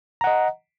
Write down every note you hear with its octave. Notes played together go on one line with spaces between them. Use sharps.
D#5 F#5 A#5